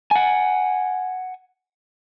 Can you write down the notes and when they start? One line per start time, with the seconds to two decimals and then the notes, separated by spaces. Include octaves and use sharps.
0.11 F#5 G#5